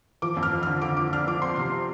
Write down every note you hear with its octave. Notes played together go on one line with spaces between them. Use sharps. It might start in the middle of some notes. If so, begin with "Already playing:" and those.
F3 D6
F2
F6
F3
D3 F6
D3 D6
F3 D6
D4 F6
F3 D6
C4 C6
C3
C4